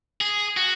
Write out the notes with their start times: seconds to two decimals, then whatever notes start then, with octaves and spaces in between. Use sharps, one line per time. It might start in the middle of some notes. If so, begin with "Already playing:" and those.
0.21 G#4
0.57 F#4